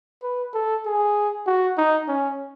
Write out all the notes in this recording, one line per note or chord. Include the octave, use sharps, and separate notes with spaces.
B4
A4
G#4
F#4
D#4
C#4